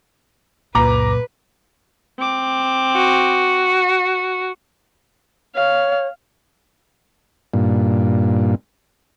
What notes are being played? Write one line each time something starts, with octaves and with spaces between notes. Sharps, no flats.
C#2 F#2 A#2 B4 A#5 D6
C4 D6
F#4
C#5 F5
G2 A#2